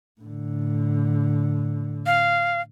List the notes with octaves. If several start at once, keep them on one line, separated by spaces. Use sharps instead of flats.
A2 D3
F5